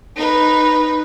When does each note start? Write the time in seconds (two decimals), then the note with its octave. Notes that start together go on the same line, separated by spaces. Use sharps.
0.17 D#4 B4